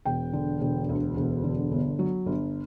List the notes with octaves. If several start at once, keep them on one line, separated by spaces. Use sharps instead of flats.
E1 G5
D3
E1
D2
E1
D3
G1
F#3
G1